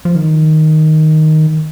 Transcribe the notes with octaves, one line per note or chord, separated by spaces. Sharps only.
F3
D#3